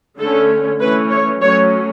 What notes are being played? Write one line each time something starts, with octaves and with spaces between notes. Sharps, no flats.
D3 A3 C#4 A4
E3 A3 C#4 B4
C#5
F#3 A3 C#4 C#5